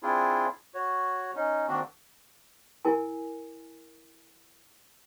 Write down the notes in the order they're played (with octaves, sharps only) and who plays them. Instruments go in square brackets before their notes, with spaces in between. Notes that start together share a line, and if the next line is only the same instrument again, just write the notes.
[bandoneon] C4 D4 E4 F4 G#4
F#4 C#5
C#4 D#4
D#3 A#3 C4 D4 F#4
[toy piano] E4 A#4 G#5